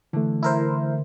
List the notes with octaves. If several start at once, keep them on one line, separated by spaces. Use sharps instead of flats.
D3 E3 A3
E4 A#4 C5